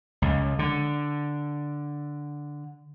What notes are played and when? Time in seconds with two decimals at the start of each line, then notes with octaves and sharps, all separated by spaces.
0.22 C#2
0.59 D3